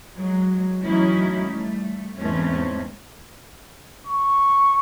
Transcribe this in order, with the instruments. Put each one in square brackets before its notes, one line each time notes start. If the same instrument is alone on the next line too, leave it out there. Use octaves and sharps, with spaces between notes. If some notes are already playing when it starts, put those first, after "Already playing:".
[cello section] F#3 G#3
E3 F#3 A3 C#4 D#4 E4
G3 A3
E2 G#2 E3 A3 C4 C#4
[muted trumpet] C#6